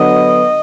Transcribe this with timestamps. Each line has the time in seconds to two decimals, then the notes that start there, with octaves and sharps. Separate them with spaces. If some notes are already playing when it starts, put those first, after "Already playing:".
Already playing: D3 F#3 B3 D#5